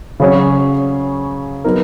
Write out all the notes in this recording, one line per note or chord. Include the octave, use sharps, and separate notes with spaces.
C#3 F#3 C#4 G#4 C#5
F#3 B3 D#4 A#4